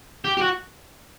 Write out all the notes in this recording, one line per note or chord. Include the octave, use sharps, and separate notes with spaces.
G4
G4
F#4